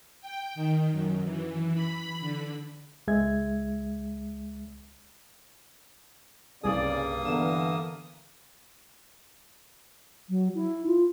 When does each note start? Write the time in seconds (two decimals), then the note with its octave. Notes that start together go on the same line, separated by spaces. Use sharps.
0.21 G5
0.55 D#3
0.91 F#2
1.24 E3
1.74 B5
2.21 D3
3.07 C#2 G#3 E5 G#6
6.63 C2 G2 C#3 A#3 G#4 D5 D#6
7.25 D3 E3 B3 A#4 E7
10.30 F#3
10.55 E4
10.86 F4